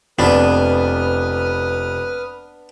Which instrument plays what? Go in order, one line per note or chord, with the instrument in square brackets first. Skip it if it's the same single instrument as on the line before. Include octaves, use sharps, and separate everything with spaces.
[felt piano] F1 [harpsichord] B3 D4 [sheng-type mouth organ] B4 D#6 F6